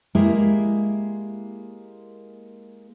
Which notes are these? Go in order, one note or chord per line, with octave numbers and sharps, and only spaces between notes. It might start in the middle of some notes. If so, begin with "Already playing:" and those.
G#3 A#3 E4 G4 A#4